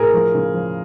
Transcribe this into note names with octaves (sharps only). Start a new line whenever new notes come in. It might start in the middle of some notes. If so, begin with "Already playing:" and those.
Already playing: A2 G#4 A#4
F3
C#3
F3